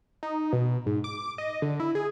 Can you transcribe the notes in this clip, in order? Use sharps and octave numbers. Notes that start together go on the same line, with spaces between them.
D#4
B2
G#2
D6
D#5
D3
E4
G#4